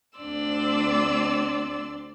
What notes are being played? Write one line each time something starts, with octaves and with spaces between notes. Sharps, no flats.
D2 C4 D4 D5 C6 E6